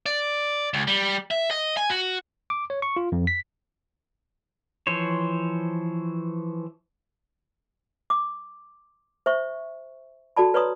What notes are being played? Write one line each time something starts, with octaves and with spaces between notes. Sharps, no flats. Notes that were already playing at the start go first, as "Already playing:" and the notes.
D5
C#2
G3
E5
D#5
G#5
F#4
D6
C#5
C#6
F4
F2
B6
E3 F3 C5 C#5
D6
C5 E5 C#6
F#4 A4 D5 A5 B5
B4 C#5 D5 A#5 C6 D#6